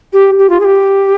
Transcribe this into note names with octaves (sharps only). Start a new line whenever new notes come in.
G4
G4
F4
G#4
G4